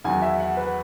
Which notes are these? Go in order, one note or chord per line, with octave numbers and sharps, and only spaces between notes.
E2 D#3 F#3 G#5
E5
F#5
B4